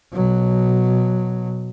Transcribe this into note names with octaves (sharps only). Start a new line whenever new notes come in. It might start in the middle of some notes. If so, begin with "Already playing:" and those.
B2 F#3